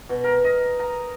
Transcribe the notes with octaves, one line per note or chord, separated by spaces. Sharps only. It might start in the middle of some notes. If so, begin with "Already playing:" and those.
B2
A#4
D#5
A#5